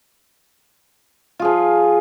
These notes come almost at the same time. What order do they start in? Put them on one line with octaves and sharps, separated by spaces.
F4 G#4 F3